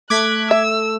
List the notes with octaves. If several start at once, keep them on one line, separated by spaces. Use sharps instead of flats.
A3 D6 F#6 G#6 B6
E5 E6